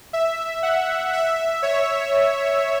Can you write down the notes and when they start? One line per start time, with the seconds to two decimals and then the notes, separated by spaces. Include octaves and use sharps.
0.13 E5
0.63 F#5
1.13 E5
1.62 C#5